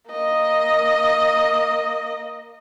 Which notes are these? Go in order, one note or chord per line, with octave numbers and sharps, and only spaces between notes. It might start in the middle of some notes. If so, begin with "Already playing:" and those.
A#3 D#5